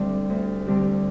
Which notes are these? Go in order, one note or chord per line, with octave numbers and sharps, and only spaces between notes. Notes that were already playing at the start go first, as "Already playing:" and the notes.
Already playing: D2 D3 G3 C4 G4
D2
D3 G3 C4 G4